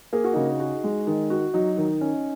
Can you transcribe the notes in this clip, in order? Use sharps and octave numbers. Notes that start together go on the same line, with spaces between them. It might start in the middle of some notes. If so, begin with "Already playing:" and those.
A#3 G#4
F#4
C#3 D#4 G#4
F#4
G#3
D#3
F#4
F#3 D#4
D#3
C#4